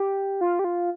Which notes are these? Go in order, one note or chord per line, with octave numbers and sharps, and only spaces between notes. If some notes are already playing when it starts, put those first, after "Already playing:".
Already playing: G4
F4
G4
F4